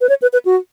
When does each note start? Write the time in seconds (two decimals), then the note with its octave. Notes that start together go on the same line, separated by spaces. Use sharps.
0.01 B4
0.09 C#5
0.22 B4
0.33 B4
0.45 F#4